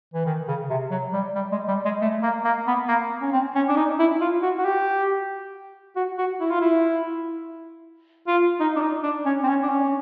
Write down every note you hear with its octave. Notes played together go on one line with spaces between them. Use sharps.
E3
D#3
C#3
C3
F#3
G3
G3
G#3
G3
G#3
A3
A#3
A#3
B3
A#3
C#4
C4
C#4
D4
D#4
E4
F4
F#4
F#4
G4
F#4
F#4
E4
F4
E4
F4
D#4
D4
D#4
D4
C#4
C4
C#4
D4
C#4